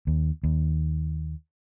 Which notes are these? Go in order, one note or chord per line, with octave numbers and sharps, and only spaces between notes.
D#2
D#2